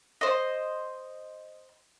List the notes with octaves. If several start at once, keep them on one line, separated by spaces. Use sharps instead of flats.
C5 D#5